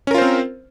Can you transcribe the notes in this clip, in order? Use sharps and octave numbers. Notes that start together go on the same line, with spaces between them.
C4 C#4 F4 A#4 C5